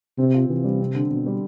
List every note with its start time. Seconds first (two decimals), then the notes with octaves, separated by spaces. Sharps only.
0.18 C3 C4
0.35 F4
0.49 C3 E3
0.64 G3
0.80 C4
0.95 D3
1.10 B2 D3
1.26 G3